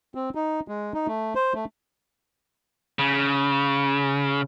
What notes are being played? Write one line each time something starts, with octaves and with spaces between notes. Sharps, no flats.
C4
D#4
G#3
D#4
A3
C5
A3
C#3